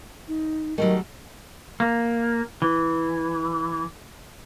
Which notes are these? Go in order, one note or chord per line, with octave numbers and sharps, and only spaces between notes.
D#4
D#3 F#3 G3 A3
A#3
E3